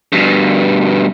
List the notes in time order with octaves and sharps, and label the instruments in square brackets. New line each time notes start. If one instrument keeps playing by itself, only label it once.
[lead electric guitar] G2 B2